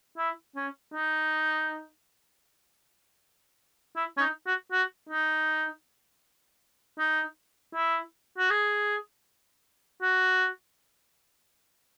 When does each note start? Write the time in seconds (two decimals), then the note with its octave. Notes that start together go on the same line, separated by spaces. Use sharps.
0.18 E4
0.56 C#4
0.94 D#4
3.96 E4
4.17 C#4
4.21 D#4
4.47 F#4
4.71 F#4
5.09 D#4
6.99 D#4
7.75 E4
8.38 F#4
8.50 G#4
10.02 F#4